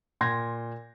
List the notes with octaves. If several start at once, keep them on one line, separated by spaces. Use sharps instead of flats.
A#2 C6 G#6 A#6